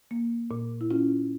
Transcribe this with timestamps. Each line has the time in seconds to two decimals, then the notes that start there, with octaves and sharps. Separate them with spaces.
0.11 A#3
0.51 A#2
0.81 E4
0.91 C#4 F4